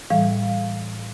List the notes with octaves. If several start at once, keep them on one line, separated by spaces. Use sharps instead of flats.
A2 E3 G3 F5